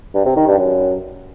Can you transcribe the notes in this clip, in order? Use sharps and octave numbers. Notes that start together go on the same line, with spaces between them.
G2
C3
D#3
G2
F#2